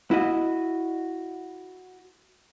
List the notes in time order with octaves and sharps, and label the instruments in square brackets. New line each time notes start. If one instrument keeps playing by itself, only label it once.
[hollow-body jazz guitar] E4 F#4 D#5